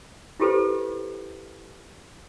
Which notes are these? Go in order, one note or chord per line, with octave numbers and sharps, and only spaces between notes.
E4 F4 G4 A4 B4 C5